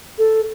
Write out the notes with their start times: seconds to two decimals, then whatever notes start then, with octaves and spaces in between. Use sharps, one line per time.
0.19 A4